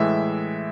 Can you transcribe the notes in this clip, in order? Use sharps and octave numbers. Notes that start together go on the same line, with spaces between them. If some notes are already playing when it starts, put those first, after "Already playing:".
Already playing: A2 E3 G#3 E5